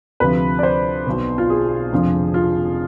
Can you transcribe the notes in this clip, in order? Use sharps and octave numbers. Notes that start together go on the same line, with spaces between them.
D2 C3 F3 B4
D5
C5
B1 B2
F4
G#4
F1 F2 D3 F3
F4